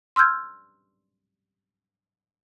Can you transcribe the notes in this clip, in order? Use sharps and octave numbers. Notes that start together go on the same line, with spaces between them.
C6 E6 F6 G6 G#6